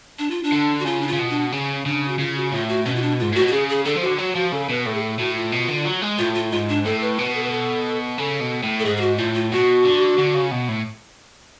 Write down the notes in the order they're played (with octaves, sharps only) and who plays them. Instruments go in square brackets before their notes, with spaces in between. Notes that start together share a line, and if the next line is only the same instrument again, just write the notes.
[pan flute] D4
F4
D4
[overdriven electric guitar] D3
[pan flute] F#4
[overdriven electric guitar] C#3 [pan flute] F4
[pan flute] D4
F4
[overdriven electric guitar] C#3
B2
[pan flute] D4
[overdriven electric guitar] C#3 [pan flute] C#4
[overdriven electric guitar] C#3 [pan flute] D4
[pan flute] F#4
[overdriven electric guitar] C#3 [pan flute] F4
[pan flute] F#4
[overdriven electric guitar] A2 [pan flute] F4
[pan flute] F#4
[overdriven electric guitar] B2 [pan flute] C#4
[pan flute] F4
D4
[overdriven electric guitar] G#2 [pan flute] F4
[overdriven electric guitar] A2 [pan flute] F#4
[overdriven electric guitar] B2
[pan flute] F#4
[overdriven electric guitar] C#3 [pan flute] G#4
[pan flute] G#4
[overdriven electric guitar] D3 [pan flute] A4
[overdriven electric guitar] F3
[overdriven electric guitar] D3 [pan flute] F#4
[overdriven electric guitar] F#3 [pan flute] F#4
[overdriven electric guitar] F3 [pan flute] F#4
[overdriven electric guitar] C#3 [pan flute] A4
[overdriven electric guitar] B2 [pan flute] B4
[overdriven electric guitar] A2 [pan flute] A4
[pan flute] G#4
A4
[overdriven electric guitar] A2 [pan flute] F#4
[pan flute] F4
[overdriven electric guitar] B2
D3
F#3
G#3
[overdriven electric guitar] A2 [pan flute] F4
[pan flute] F4
[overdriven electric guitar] G#2 [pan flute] F4
[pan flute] D4
[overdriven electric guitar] A2 [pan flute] A4
[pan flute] B4
[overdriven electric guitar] B2 [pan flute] B4
[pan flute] A4
B4
A4
[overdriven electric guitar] C#3 [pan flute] A4
[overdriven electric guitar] B2
A2
[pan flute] A4
[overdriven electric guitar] G#2 [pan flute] G#4
[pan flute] G#4
F#4
[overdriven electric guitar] A2 [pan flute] F4
[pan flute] F4
[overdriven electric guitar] B2 [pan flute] F#4
[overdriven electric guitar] D3
D3
C#3
B2
A2